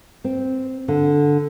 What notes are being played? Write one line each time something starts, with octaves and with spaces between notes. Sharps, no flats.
C4
D3